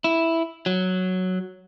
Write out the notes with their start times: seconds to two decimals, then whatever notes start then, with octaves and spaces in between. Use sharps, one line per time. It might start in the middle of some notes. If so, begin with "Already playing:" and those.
0.04 E4
0.66 F#3